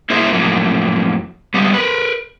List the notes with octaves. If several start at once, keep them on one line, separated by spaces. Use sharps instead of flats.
A#3 E4 G#4 C5 D#5 E5
F2 A2 F#3 A#3
G3 G#3 B3
A#4 B4